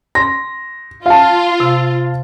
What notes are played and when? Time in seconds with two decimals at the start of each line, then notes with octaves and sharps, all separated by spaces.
0.15 C6 A#6
1.06 F4 F5 A5
1.60 C3